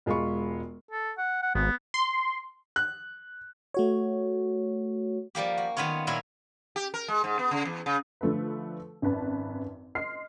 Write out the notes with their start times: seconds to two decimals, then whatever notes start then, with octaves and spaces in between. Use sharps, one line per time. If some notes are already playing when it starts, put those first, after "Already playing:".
0.06 E1 G#3 F4 B5 C#6
0.91 A4
1.18 F#5
1.43 F#5
1.55 G#1 B3
1.94 C6
2.76 F#6
3.74 A3 F#4 C#5
5.35 F3 G3 A#3 G4
5.57 F#4
5.77 D#3 F#3 B3 F4 C#5
6.07 A#2 F#3 E4 A#4 C#5
6.76 G4
6.94 A#4
7.08 G#3
7.24 G#2
7.39 B3
7.51 C#3
7.65 E2
7.86 C#3
8.21 D3 F3 A3 A4 B4
9.02 G#1 F#2 B4 A5
9.95 D#5 C6 F6 C7